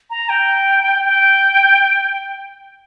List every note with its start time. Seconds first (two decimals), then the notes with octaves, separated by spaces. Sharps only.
0.10 A#5
0.29 G5
1.05 G5